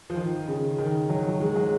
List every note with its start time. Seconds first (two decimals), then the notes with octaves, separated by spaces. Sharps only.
0.10 F3
0.16 D#3
0.48 C#3
0.78 D#3
1.09 F#3
1.28 F#3
1.40 G#3
1.56 F#3